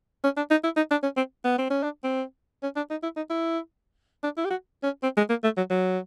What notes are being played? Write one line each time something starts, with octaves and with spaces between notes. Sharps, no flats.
C#4
D4
D#4
E4
D#4
D4
C#4
C4
B3
C4
C#4
D4
C4
C#4
D4
D#4
E4
D#4
E4
D4
E4
G4
F#4
C#4
C4
G#3
A#3
A3
F#3
F#3